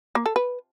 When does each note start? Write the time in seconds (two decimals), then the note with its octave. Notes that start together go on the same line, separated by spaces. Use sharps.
0.15 A#3
0.26 A4
0.36 B4